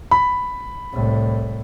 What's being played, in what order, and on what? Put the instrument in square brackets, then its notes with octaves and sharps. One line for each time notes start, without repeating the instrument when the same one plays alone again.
[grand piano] B5
[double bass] C2 A2